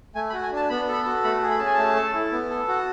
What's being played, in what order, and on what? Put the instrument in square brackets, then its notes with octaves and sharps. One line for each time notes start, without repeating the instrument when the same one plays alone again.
[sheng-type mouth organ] A3 G#5
B5
F#4
G#5
D4 A5
B3 B5
A4 B5
F#4
A3 B5
G#4
B5
C#4 A5
G#5
A3 A5
A4
E4
B3
A4
F#4